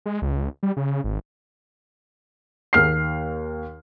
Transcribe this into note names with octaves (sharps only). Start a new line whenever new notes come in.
G#3
C#2
G3
C#3
G#1
D#2 F6 C7